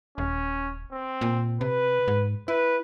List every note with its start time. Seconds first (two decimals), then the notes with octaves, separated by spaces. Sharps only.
0.18 D#1 C#4
0.92 C4
1.21 A#2
1.61 C3 B4
2.08 G#2
2.48 E4 B4